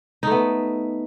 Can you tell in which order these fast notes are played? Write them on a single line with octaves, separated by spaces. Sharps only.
D#4 A3 B3